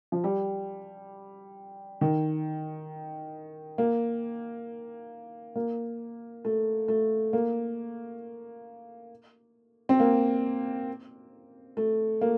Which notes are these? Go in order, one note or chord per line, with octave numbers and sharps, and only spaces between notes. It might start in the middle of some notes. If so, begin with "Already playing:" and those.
F3
G3
D#3
A#3
A#3
A3
A3
A#3
C4
A#3
A3
A#3